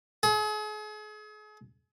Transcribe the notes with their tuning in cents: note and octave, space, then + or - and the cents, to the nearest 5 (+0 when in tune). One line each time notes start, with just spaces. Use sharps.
G#4 +40